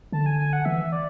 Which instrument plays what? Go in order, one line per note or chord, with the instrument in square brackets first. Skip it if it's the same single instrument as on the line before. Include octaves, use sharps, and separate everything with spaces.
[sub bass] D3 [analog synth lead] A5
[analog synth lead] G#5
G#5
F#5
[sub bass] E3 [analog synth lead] E5
[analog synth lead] D5